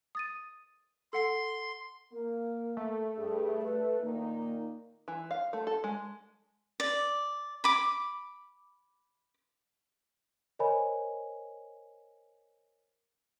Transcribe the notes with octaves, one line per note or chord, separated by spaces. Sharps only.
D#6 A6 D#7
A4 F#5 C6 C7
A#3 A#4
A3
G2 G#4
B4
A#2 D#3 A#3 D#4
E3
F5
A3
A4
G#3
D5
B5 D6
A#4 C5 C#5 D#5 G#5 B5